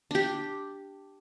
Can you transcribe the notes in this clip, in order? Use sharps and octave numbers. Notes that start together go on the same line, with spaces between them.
D4 G4